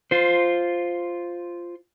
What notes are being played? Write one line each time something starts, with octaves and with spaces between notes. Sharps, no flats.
F4 C5